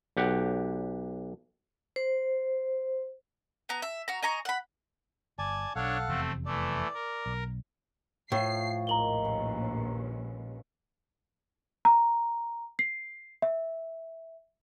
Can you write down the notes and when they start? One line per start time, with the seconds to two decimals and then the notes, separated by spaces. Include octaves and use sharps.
0.17 B1 G4 F#5
1.96 C5
3.69 B3 A#5
3.82 E5
4.08 F#4 A#5
4.22 D#5 G#5 A#5 C#6
4.45 F#5 B5
5.39 G1 D5 G#5 A5
5.76 B1 D4 A4 C#5 F5 F#5
6.08 F1 E2 C3 A3 C4
6.46 E3 A3 D5
6.94 A#4
7.26 B1
8.32 A2 F3 A3 C7
8.87 A#1 D#2 D#3 G#3 A#5 F#7 G7
9.24 C#4 B4
11.85 A#5
12.79 C7
13.42 E5